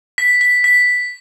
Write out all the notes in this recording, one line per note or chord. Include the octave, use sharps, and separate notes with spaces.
B6
B6
B6